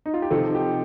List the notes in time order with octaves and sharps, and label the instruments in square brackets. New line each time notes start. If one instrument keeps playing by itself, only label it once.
[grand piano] D#4
F4
G4
[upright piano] C3 F3 C4 D#4 [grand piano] A4
[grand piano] G4